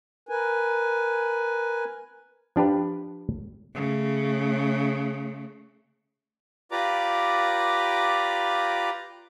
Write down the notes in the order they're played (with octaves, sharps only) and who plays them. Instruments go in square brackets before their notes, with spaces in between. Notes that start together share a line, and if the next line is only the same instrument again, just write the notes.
[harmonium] A#4 B4 G#5
[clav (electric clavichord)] F3 D4 G4 B4
[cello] C#3 A3
[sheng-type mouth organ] F4 G4 B4 D5 A#5 D6